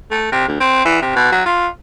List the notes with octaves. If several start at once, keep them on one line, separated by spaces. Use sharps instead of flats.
A3
C3
D2
C4
E3
C3
B2
F#3
F4